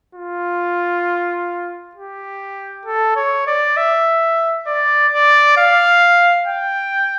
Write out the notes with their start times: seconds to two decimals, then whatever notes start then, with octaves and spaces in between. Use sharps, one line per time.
0.15 F4
1.95 G4
2.86 A4
3.16 C#5
3.47 D5
3.77 E5
4.67 D5
5.13 D5
5.57 F5
6.47 G5